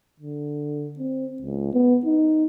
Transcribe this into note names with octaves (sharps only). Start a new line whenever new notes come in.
D3
C4
C#2
B3
D#4